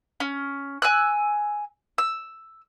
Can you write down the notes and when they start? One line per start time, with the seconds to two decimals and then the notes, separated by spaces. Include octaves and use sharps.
0.20 C#4
0.82 G#5 E6 F#6
1.98 E6